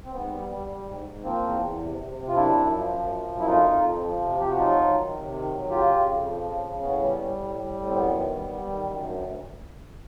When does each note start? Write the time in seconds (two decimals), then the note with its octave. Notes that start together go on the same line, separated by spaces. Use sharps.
0.04 C4
0.12 G#2 B3
0.30 G3
0.49 G3
0.67 G3
0.86 G#2
1.05 G#2
1.23 F3 A#3 C4
1.42 E2
1.61 E2
1.79 C3
1.97 C3
2.17 C3
2.28 F4
2.34 F#2 D4 E4
2.53 F#2
2.73 F3
2.91 F#2
3.10 F3
3.29 F#2
3.39 E4
3.46 F2 D#4 F4
3.65 F2
3.84 F3
4.02 F3
4.21 C3
4.40 F3 G4
4.49 F#4
4.58 F#3 D#4 F4
4.77 F#3
4.95 D#3
5.14 C3
5.32 D#3
5.51 F#3
5.70 C#3 F4 G4
5.88 C#3
6.07 F2
6.26 F3
6.44 C#3
6.62 C#3
6.81 A2 B3 C#4
7.00 G3
7.18 G3
7.37 A2
7.56 G3
7.75 A2
7.87 C4
7.93 F#2 B3
8.12 D#3
8.30 G3
8.49 G3
8.67 D#3
8.85 F#2
9.04 D2
9.23 D2